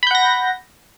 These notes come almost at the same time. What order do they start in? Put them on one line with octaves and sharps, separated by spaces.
B5 G6 F#5 A#6